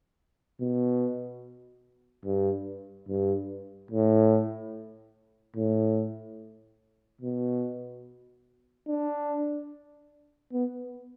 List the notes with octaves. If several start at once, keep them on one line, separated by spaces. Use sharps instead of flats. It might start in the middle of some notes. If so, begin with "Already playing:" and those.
B2
G2
G2
A2
A2
B2
D4
B3